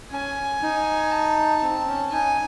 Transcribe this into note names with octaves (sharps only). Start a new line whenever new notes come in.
C#4 G#5
D#4
A5
C4
C#4
D#4 G#5